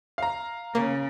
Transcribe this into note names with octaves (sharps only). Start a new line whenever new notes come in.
F5 A#5
C#3 A#3